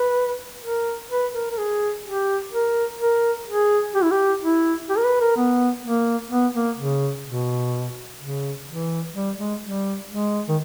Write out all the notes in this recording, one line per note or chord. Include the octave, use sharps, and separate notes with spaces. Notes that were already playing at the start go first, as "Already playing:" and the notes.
Already playing: B4
A#4
B4
A#4
A#4
G#4
G4
A#4
A#4
G#4
G4
E4
G4
E4
G4
A#4
B4
A#4
B3
A#3
B3
A#3
C#3
B2
C#3
E3
G3
G#3
G3
G#3
D#3